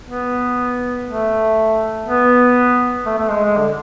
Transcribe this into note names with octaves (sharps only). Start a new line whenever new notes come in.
B3
A3
B3
A3
A3
G#3
G#3
D3